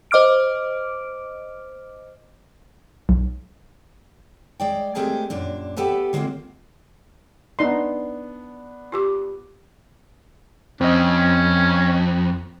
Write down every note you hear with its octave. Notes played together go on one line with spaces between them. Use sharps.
C5 D#5 D6 F6 D7
B1
G#3 D5 G5
G#3 A3 C4 G4 G#4 A#4
F#2 A#2 D4
B3 G4 A4 B4 E5
D3 G#3 A#3 C4 F4
B3 D4 D#4 C6
F4 G4 D6
F2 C4 C#4 D#5